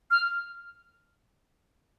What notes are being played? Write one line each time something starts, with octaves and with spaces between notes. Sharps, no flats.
F6